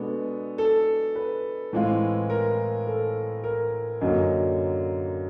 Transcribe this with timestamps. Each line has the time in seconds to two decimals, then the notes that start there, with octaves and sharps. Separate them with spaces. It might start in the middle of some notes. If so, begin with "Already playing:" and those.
Already playing: B2 G#3 B3 D4 A4
0.58 A4
1.15 B4
1.73 A2 E3 G#3 C4 F4
2.30 A#4
2.87 A4
3.44 A#4
4.01 F#2 D3 F#3 A#3 D#5